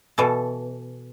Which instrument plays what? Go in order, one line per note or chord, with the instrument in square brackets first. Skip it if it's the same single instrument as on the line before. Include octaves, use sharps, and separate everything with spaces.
[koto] B2 E3 A4